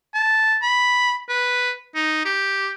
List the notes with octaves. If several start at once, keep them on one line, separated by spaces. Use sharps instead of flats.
A5
B5
B4
D#4
G4